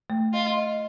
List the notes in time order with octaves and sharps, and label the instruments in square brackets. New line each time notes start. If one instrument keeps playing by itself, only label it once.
[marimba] A3
[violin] F4 [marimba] D#5
[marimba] D#5